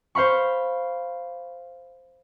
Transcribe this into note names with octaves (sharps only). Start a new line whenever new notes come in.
C5 F5 B5 C#6